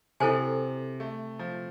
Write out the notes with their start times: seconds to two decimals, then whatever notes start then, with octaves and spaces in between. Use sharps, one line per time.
0.20 C3 E4 A4 C5 G#5
1.00 A3
1.39 F3